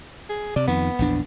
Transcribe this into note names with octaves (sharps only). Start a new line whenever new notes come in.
G#4
C3 D5
F2 D#3 B3
A#1 E2 D4